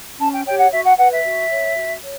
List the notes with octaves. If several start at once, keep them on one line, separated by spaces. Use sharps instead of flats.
C#4 A5
G5
G4 C#5 G5
F#5
F#4 E5
F#5
B4 F#5
E5
F#4
C#5
F#4
C#5